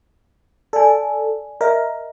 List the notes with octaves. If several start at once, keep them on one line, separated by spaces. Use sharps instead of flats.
A4 D5 G#5
A#4 D#5 E5